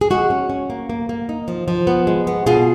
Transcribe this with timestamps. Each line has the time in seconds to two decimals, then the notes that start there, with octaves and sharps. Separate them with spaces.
0.01 G#4
0.10 G#3 F#4
0.30 C#4
0.49 C#4
0.70 A#3
0.90 A#3
1.09 A#3
1.29 D#4
1.48 F3
1.68 F3
1.87 B3
2.07 G#3
2.27 B3
2.46 B2 F4 G#4